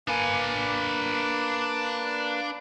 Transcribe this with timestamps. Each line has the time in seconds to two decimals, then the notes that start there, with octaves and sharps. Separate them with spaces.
0.08 A#3 D4 B4 G#5